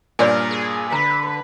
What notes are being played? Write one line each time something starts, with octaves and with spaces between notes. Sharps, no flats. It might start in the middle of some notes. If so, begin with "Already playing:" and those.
G2 A#2 A#4 C#5 D5 G#5
G#4
D3 B4 A#5